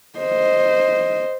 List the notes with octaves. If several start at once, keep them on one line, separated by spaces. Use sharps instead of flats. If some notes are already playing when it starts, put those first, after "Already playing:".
C5 D#5